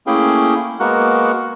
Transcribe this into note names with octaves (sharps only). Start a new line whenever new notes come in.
A3 A#3 C#4 E4 G#4 G5
G#3 A#3 B3 F#4 A#4 F#5